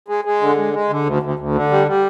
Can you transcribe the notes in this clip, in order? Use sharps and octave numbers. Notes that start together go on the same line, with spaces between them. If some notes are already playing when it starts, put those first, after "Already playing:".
G#3
G#3
D3
G#3
G#3
D3
D2
D2
D2
D3
G3
G3